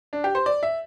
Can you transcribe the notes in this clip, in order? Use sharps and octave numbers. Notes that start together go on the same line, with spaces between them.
D4
G4
C5
D5
E5